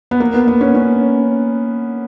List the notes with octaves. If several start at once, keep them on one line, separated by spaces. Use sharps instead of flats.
B3
A#3
B3
B3
C#4
C#4